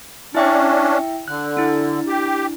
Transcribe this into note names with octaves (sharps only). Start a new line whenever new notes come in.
C#4 D4 E4 E5 G5
D3 F#6
D4 E4
G4